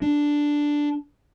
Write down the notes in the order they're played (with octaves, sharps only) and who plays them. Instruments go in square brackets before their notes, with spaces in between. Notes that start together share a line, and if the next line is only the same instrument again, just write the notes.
[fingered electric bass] D4